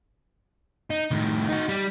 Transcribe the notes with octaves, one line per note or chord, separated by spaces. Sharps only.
D#4
A2 D#3
D#4 F#4
G3